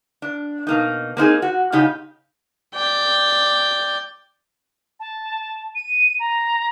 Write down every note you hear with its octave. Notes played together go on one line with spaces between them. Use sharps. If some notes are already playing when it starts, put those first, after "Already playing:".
D4
B2 A#3 D#4
A#3 C4 D#4 G#4
F#4
A#2 C#3 D#4 G4
D5 G5
A5
D#7
A#5